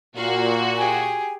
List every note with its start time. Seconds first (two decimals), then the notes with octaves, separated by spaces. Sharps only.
0.16 A#2 F#4 F5
0.77 G4 G#4 G#5